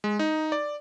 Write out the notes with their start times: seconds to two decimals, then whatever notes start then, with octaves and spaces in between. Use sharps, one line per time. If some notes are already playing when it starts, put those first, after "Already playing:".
0.04 G#3
0.19 D#4
0.52 D5